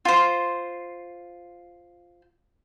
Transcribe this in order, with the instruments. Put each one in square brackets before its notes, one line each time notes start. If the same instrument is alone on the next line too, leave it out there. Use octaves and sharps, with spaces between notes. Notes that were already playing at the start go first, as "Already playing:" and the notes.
[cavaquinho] F4 C5